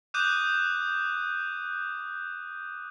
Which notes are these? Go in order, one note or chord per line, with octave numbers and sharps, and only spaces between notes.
D6 D#6 F#6 G6 D#7